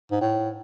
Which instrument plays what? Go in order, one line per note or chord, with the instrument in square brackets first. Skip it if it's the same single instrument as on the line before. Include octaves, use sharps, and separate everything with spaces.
[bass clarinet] G#2
A2